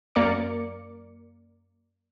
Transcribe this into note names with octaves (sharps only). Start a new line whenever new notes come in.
F#2 A#3 A#4 D5 D6 C#7